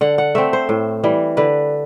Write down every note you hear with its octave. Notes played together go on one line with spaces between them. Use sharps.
D3 F#5
F#5
A3 C4 E5
C5
A2
E3 G3
D3 B4